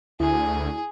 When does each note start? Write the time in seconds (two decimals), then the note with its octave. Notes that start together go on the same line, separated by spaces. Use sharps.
0.20 D2 E4 G#4 G#5